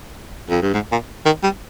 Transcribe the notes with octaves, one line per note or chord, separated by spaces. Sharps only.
F2
G2
G#2
A#2
D#3
G3